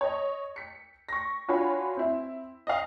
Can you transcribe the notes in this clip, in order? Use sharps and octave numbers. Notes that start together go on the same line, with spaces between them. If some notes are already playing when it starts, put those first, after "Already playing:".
C#5 D#5
B6 C#7
C#6 A#6
D4 F4 F#4 C#5 G#5 B5
C4 E4
D#5 F5